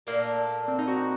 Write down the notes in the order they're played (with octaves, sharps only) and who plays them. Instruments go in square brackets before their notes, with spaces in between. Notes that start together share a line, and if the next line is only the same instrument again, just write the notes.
[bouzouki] A#2 A3 D4 A4 [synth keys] A#3
[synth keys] C4
D#4
F#4